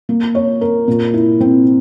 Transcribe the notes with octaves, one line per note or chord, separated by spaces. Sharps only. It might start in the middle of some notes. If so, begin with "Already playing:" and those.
A#3
C#5
A#4
A#2
E4
C4